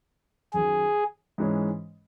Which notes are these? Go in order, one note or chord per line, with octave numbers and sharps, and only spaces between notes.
F#2 D#3 F#3 G#4
G#2 E3 G#3 C#4